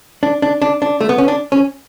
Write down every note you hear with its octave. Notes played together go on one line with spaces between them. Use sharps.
D4
D4
D4
D4
A3
B3
C#4
D4
C#4